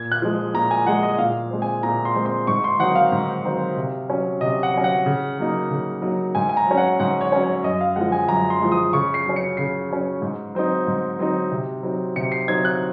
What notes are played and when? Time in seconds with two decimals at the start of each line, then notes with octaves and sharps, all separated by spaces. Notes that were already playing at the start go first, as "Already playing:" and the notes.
Already playing: A#2 G#6
0.12 F#6
0.22 F3 G#3
0.54 A#2 A#5
0.71 G#5
0.86 F3 G#3 F#5
1.03 D#5
1.18 A#2 F5
1.50 G#3 C4
1.62 G#5
1.83 A#2 A#5
2.05 C6
2.15 G#3 C4
2.26 C6
2.47 G#2 C#6
2.64 C6
2.80 D#3 F#3 C4 D#4 F#5
2.95 F5
3.12 G#2
3.45 D#3 F#3 C4 D#4
3.77 C3
4.09 F#3 C#4
4.41 C3 D#5
4.63 F#5
4.74 F#3 C#4
4.84 F#5
5.06 C#3
5.39 F#3 A#3 D#4
5.70 C#3
6.02 F#3 A#3 D#4
6.35 G#2 G#5
6.49 G#5
6.57 A#5
6.67 F#3 C#4
6.77 F#5
7.00 G#2 F#5
7.21 C#5
7.32 F#3 C#4
7.43 C#5
7.54 C#5
7.63 F#2 D#5
7.81 F5
7.96 F3 G#3 F#5
8.12 G#5
8.28 F#2 A#5
8.50 C6
8.61 F3 G#3
8.72 D#6
8.93 C#3 C#6
9.14 C7
9.25 F#3 C#4
9.36 C#7
9.57 C#3 C7
9.90 F#3 C#4
10.22 G#2
10.55 F#3 C4 D#4
10.87 G#2
11.19 F#3 C4 D#4
11.51 C3
11.83 F#3 C4 D#4
12.16 C3 C#7
12.32 C7
12.48 F#3 C4 D#4 G#6
12.65 F#6